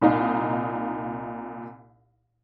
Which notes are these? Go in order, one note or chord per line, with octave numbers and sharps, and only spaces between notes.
C2 A#2 D#4 F5